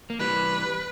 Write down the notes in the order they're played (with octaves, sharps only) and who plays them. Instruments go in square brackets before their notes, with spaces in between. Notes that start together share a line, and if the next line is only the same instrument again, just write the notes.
[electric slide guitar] A#3
[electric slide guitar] E3 G3 [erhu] B4